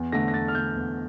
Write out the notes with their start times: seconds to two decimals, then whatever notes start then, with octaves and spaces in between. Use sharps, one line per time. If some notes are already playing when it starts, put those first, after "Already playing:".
Already playing: E2
0.12 D3 A3 A#6
0.28 A#6
0.33 E2 A6
0.48 F6
0.54 D3 A3 G6
0.76 E2